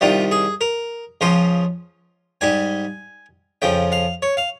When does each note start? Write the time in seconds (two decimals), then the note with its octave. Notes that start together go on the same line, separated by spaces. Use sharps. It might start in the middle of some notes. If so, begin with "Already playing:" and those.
0.01 C2 C3 D#3 G3 F4
0.31 G#4
0.61 A#4
1.21 C#2 C#3 F3 C5
2.41 G#2 G3 G#5
3.62 F2 C#3 F3 G5
3.92 F5
4.22 C#5
4.37 F5